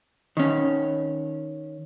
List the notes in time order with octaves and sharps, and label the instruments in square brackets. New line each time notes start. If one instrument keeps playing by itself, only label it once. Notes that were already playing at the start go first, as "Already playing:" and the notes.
[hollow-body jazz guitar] D#3 C#4